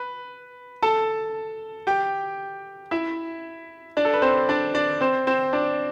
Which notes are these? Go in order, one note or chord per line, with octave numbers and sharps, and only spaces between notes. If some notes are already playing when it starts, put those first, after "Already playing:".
Already playing: B4
A4 A5
G4 G5
E4 E5
D4 D5
A4
B4
C4 C5
D4 D5
D4 D5
C4 C5
C4 C5
D4 D5